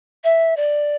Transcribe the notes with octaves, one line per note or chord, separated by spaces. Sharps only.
E5
D5